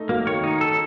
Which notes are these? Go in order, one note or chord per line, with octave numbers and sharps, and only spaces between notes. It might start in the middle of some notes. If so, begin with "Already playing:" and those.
Already playing: A3 D#4
F#3 A#3
D#3 C#5
D#4
A4